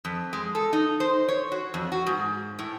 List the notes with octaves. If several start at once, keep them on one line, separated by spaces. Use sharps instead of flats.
F2
G#3
A4
D#4
C5
C#5
F#4
F2
F#4
G#2
A2